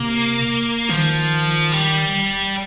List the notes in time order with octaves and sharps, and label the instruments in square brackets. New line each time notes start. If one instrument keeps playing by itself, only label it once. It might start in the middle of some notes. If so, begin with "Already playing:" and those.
Already playing: [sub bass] C3 [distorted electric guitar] A#3
[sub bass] D#3 [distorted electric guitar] F3
[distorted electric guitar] G3